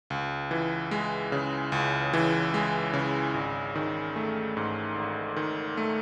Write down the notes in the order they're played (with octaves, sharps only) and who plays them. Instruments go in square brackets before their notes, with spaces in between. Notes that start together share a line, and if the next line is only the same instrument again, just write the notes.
[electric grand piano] C#2
E3
G#3
C#3
C#2
E3
G#3
C#3
G#1
D#3
A3
G#2
G#1
D#3
A3